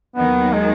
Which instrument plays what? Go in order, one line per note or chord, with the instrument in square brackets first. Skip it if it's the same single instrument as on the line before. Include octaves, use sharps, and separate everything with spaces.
[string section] D#2 D#3 F#3 [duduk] B3
[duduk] G#3